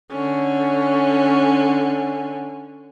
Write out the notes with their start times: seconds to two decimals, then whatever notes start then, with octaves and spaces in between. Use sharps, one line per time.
0.11 D3 C#4